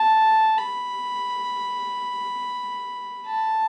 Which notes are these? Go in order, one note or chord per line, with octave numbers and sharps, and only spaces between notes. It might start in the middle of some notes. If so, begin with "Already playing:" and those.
Already playing: A5
B5
A5